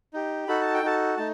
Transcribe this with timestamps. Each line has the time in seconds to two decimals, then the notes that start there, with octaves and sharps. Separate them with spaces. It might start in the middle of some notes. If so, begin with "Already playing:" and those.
0.13 D#4 G4
0.48 D#4 F#4 A4 B5
0.61 A5
0.74 G5
0.83 D#4 F#4 A4 A5
1.17 A3 D#4 A5